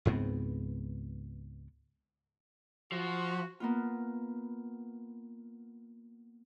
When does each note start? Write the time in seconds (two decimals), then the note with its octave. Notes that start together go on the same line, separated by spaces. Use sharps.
0.05 C#2 G#2 B3 C4
2.92 F3 F#4
3.60 A#3 B3 F4